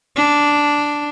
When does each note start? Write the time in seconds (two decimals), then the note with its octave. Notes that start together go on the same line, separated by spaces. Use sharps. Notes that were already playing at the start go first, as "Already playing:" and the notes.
0.16 D4